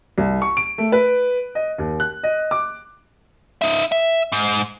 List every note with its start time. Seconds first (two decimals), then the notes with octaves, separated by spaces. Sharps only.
0.18 C2
0.42 C#6
0.57 D7
0.78 A3
0.92 B4
1.55 D#5
1.78 D#2
2.00 F#6
2.23 D#5
2.51 D6
3.62 D#4 E5
3.92 E5
4.32 G#2